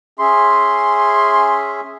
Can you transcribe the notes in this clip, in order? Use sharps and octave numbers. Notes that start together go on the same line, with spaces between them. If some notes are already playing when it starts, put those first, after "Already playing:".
C#4 G#4 E5 C6